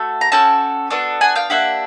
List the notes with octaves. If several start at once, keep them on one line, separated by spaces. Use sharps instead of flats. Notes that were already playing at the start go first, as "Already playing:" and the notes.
Already playing: A3 F#4 A4
A#5
C#4 F#4 A4 G5 A5
B3 D4 F#4 A4
F#5 G#5
F5 G5
A#3 D4 G4 E5 F#5